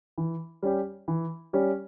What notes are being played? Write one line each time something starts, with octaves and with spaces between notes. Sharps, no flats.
E3
G3 C#4 G4
E3
G3 C#4 G4